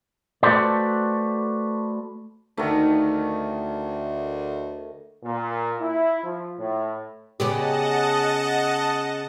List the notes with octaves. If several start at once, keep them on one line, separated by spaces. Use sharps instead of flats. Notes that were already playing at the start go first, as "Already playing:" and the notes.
A3 F#4 A4 B4 C5 D5
D2 D#3 A3
A#2
E4
F3
A2
C#3 B3 G4 D#5 F#5 A5